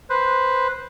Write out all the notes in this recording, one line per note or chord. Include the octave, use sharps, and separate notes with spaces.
B4 C5